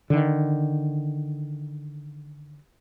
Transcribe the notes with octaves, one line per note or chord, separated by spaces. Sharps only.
D3 D#3